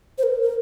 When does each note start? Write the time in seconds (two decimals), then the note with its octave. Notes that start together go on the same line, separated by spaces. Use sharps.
0.18 C5
0.23 A#4
0.42 A#4